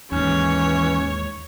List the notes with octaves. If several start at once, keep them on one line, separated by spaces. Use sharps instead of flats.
D#2 G#2 E3 C#4 C#5